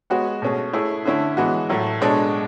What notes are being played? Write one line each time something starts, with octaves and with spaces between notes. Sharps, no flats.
G#3 B3 F#4 C#5
B2 A3 C#4 G#4
A3 E4 G#4 C#5
D3 A3 C#4 E4
E3 G#3 B3 F#4
A2 F#3 A3
B2 G#3 D4 A4 C#5